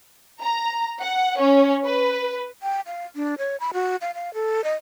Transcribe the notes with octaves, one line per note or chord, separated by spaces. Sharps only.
A#5
F#5
C#4
B4
G5
F5
D4
C#5
B5
F#4
F5
F5
A4
D#5